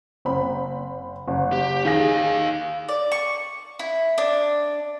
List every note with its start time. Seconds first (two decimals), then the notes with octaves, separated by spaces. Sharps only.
0.25 F#1 C4 B5
1.27 F#1
1.52 G4
1.85 D#3 D#4 G#4 F5 A#6
2.89 D5
3.12 C#6
3.79 E4
4.18 D4